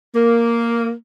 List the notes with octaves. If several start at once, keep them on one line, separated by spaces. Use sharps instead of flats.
A#3